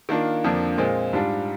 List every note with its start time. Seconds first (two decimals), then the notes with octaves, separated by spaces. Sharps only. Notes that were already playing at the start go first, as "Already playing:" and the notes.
0.09 D#3 A#3 D4 F4
0.44 F2 D3 F3 A#3 D4
0.78 A#2 G#3 C4 F4
1.13 G#2 G3 D4 F4